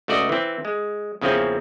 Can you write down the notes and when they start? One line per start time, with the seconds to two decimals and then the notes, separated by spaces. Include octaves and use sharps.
0.08 C#2 A3 F#4 D5 D#5
0.29 E3 C4
0.65 G#3
1.21 E2 C#3 F3 A#3 C4 C#4